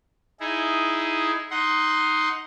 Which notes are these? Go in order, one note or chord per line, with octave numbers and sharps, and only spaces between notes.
D#4 E4 G#4
D#4 F#5 C6